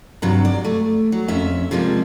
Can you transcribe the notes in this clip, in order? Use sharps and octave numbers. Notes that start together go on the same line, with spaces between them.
G2 C3 F#3
D5
A3
F#3
F2 C#4 E5
C3 F3 G3 G#3 A#3